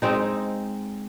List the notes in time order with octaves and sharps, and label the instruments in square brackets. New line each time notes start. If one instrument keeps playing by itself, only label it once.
[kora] G#3 C4 D#4